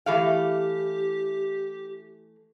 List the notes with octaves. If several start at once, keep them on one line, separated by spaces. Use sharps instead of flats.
E3 A3 G4 F5